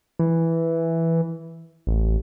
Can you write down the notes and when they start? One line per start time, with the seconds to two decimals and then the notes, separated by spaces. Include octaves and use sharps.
0.19 E3
1.87 A1